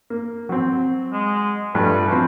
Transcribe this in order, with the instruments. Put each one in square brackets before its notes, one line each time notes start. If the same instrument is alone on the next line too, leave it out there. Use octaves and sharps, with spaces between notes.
[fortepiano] A#3
F#3 C4
[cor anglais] G#3
[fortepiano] G2 F3 A3 [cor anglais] B4
[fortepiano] F3 C4 [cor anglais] F#4